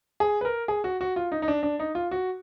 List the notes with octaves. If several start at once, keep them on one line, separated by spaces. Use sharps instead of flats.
G#4
B4
A#4
G#4
F#4
F#4
F4
D#4
D#4
D4
D4
D#4
F4
F#4